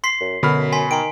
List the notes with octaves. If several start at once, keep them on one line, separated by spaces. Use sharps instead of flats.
C6 B6 C7
F#2
F#2 B2 D3 B5 F6
G#5 C6 B6
D#3 G5 A#5 C6 D7